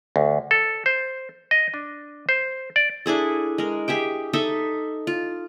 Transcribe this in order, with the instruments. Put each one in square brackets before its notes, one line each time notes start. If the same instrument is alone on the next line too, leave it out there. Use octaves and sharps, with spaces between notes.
[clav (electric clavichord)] D2
A4
C5
D#5
D4
C5
D5
[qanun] D4 E4 G#4 A4
G#3 A#4
G4 G#4 E5 G5
D#4 A4 D#5 E5
F4